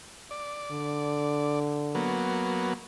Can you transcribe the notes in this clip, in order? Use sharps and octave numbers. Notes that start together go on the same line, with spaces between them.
D5
D3
F#3 A#3 B3